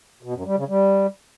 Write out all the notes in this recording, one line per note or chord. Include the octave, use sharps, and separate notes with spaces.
B2
F#2
G3
C#3
G3